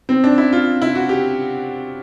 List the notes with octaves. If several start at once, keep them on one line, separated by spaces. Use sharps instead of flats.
C4
D4
E4
F4
E4
F#4
G4